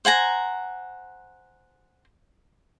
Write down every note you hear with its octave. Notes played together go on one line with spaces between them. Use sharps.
C5 F#5 G#5 A#5